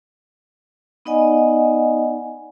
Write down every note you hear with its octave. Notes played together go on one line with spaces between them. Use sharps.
B3 D#4 D5 D#5 F#5 G#5